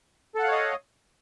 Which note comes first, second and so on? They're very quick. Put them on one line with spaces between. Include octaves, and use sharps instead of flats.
A4 F#5 F5 C#5 D#5